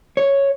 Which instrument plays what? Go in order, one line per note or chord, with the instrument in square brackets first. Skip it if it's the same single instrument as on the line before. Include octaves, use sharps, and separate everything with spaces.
[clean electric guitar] C#5